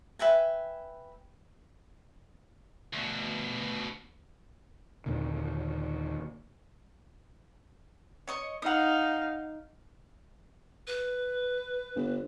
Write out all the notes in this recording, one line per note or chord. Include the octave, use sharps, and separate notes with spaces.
B4 E5 G5 G#5
D2 B2
D#2 A#2 D3 D#3
C#5 D#5 C#6
D#4 F5 F#5 D#6
B4
G1